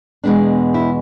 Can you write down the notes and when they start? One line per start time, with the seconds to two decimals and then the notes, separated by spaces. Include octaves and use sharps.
0.23 E2 B2 G#3 B3 D4
0.74 E4